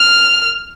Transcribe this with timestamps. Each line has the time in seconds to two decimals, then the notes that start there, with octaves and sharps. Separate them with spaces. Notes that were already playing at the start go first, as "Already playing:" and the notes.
Already playing: F6